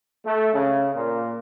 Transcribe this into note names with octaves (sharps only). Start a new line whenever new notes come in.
A3
C#3
A#2